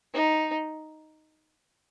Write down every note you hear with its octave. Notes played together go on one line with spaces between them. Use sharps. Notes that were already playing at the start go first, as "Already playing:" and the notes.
D#4